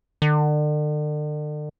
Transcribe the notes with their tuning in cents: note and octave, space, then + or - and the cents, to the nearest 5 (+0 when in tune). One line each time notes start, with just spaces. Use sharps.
D3 +40